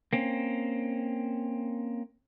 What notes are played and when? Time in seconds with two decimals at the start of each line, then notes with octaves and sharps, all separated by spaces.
0.13 A#3 C4 C#4